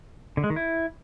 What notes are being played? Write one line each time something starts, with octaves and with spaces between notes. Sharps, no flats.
D3
G#3
D#3
E4